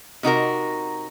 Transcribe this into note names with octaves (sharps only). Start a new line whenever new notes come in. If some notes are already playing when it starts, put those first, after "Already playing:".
C3 D#4 F#4 A#4